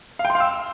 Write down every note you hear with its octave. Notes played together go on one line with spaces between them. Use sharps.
F5
G5
C6
F5
E6